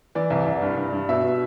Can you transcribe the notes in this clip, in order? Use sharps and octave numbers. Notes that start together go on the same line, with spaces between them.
E3 D5
C2
C2
G2
G2
G2
B2 E5
B2